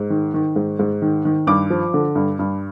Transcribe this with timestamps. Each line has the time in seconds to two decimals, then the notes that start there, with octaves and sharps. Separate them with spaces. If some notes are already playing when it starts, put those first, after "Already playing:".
Already playing: G#2
0.10 D#3
0.34 D#3
0.56 G#2
0.79 G#2
1.02 D#3
1.25 D#3
1.47 G2 D6
1.70 F3
1.94 D3
2.15 G2
2.39 G2